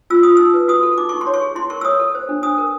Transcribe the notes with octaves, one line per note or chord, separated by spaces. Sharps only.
F4 E6
F4 D#6
D#4 E6
B4
F#4 D#6
A4
D#4 D6
D#4 C#6
C6
C#5
C#6
G#4
E4 C6
A#4 C#6
E6
C#5 D#6
A4
C5
D4
D4 D#6
A#4